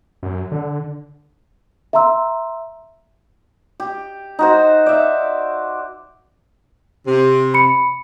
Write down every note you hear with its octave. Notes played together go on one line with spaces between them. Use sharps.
F#2
D3
E5 F5 A#5 C6 E6
G4
D#4 F#4 C5
D5 E5
C3
B5 C#7